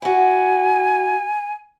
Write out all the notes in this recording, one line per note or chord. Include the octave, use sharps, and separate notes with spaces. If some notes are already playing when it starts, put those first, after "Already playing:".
E4 F#4 G#5